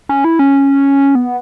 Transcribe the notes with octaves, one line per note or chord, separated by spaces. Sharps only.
C#4
E4
C#4
B3